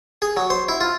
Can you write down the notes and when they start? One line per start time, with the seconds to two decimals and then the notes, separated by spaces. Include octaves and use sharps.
0.22 G#4
0.37 F#3
0.50 C5
0.69 E4
0.81 F4